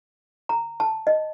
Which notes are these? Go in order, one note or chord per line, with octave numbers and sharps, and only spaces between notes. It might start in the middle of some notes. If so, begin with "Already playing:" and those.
A#5
A5
D#5